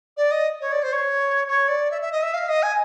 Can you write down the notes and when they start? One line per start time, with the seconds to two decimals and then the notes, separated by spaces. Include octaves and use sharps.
0.17 D5
0.32 D#5
0.61 C#5
0.72 D5
0.83 C5
0.93 C#5
1.48 C#5
1.68 D5
1.91 E5
2.02 E5
2.12 D#5
2.23 E5
2.34 F5
2.49 D#5
2.63 G#5